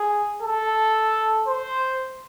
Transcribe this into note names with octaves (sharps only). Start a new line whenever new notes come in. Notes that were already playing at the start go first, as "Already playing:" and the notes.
Already playing: G#4
A4
C5